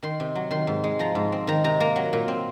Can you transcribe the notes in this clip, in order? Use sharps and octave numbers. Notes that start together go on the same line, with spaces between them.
D#3 C6
C3
F#3
D#3 C6
G#2
G#3
F3 A#5
G#2
C4
D#3 A#5
C3 A#5
A#3 A#5
F#3
A#2
C4